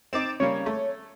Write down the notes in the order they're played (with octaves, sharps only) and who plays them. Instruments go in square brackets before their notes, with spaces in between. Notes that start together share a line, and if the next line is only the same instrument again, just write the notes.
[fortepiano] C4 D#4 [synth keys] D6 A6 E7
[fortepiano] C#3 G3 A#3 [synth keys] C#5
[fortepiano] A3